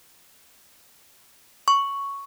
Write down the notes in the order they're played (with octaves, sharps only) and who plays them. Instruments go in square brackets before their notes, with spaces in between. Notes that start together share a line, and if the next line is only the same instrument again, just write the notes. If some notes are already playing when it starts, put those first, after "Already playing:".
[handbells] C#6